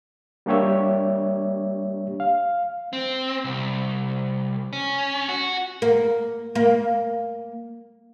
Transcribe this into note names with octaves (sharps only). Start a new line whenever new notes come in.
G3 A#3 D4 G4 C#5 E5
F5
C4
C2
C#4
F#4
A#3
A#3